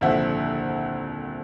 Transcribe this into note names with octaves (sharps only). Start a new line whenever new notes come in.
D#1 C2 D3 F3 E5 F#5